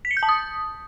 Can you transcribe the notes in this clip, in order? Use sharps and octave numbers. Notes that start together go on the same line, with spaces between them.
B6
C#7
G6
A5
D#6